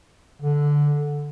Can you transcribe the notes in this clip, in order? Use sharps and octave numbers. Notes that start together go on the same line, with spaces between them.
D3